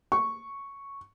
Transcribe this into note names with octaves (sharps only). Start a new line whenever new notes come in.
C#6